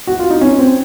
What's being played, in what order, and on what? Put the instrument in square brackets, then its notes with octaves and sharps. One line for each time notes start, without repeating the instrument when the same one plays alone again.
[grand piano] F#4
F4
D#4
C#4
C4